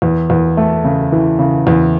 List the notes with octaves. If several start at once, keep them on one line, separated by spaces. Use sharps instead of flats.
E2
E2
A3
C#3
E3
C#3
E2